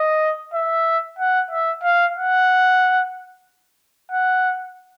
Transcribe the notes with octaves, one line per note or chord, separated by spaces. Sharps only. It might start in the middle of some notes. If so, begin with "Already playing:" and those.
Already playing: D#5
E5
F#5
E5
F5
F#5
F#5